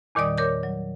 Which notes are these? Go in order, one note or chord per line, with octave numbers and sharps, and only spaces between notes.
E2 A#2 D#3 G3 D5 D#6
A#4 C#5 D6 G6
F#3